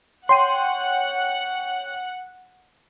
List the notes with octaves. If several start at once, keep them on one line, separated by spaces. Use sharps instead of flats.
C#5 F#5 G5 C6 D#7